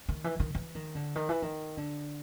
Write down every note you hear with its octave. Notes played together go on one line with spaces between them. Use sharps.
D#3
E3
D#3
E3
D#3
D3
D#3
E3
D#3
D3